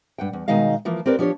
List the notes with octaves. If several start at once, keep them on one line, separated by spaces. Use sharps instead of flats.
G2 F#5 G5
E2
B2 D#3 G#3 D#4 D#5 F5
E3 F3 A#3
C4 G4 A#4 B4 D5
F3 D4 G4 C#5